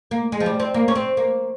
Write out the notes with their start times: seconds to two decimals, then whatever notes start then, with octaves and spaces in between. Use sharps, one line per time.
0.11 A#3
0.32 G#3
0.40 F3
0.46 G3
0.60 C4
0.74 A#3
0.88 C#4
0.95 C4
1.17 A#3